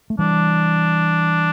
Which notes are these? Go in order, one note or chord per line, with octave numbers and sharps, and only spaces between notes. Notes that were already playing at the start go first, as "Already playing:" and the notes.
A3
E3 G3 D4